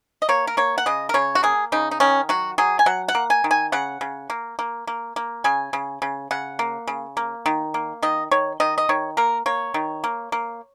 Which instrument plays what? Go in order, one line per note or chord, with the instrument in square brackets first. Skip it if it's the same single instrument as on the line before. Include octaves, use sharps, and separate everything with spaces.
[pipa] D#5
A#3 C#5
A#4
A#3 C#5
F#5
C#3 D#5
A#4
C#3 C#5
F#4
A#3 G#4
C#3 D#4
D#4
D#3 C#4
F#3 F#4
F#3 G#4
G#5
F#3 F#5
F#5
A#3
G#5
D#3
G#5
C#3 F#5
C#3
A#3
A#3
A#3
A#3
C#3 G#5
C#3
C#3
C#3 F#5
A#3
C#3
A#3
D#3
A#3
D#3 D#5
D#3 C#5
D#3 D#5
D#5
D#3 C#5
A#3 A#4
A#3 C#5
D#3
A#3
A#3